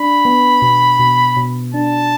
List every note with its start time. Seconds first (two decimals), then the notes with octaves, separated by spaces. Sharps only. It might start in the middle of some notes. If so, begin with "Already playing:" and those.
Already playing: D4 B5
0.25 B3
0.62 B2
0.99 B2
1.36 B2
1.74 D4 A5